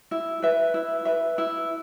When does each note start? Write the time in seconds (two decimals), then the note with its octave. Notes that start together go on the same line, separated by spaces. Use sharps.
0.11 E4
0.42 B4 E5
0.74 E4
1.05 B4 E5
1.38 E4